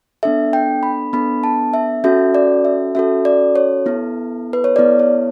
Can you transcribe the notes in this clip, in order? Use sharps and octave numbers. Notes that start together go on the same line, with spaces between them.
B3 D4 A4 E5
G5
B5
B3 D4 A4 B5
A5
E5
C#4 F#4 A4 E5
D5
E5
C#4 F#4 A4 E5
D5
C#5
B3 E4 A4
B4
C#5
B3 E4 A4 D5
C#5